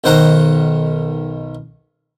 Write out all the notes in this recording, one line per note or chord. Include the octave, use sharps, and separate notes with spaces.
B1 D#3 C5 F#5 A#5